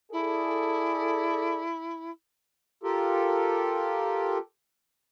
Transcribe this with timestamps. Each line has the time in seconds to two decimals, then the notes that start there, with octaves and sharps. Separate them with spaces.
0.12 E4 G#4 A4 D5
2.83 F4 G4 A4 A#4